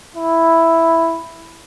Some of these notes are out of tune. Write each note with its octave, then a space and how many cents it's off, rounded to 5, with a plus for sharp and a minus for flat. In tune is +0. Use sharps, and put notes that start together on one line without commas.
E4 +0